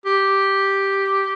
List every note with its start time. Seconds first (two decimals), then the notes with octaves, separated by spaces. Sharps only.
0.06 G4